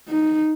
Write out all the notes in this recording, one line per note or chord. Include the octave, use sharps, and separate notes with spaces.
D#4